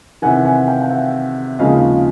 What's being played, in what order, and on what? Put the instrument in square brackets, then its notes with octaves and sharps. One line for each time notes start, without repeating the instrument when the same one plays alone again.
[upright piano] E2 C3 D#3 F#5 G#5
F#5 G#5
F5 G5
G5
E5 F#5
D#2 C#3 F3 G#3 D#5 F5